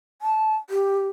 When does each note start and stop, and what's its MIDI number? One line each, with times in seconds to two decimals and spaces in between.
0.22 0.55 81
0.70 1.08 67